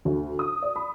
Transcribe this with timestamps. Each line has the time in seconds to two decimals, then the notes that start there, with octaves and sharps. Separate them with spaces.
0.05 D2
0.39 D#6
0.62 D5
0.76 B5